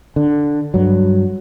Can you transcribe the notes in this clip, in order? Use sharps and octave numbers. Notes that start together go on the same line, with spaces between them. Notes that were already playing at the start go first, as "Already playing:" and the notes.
D3
G2 F#3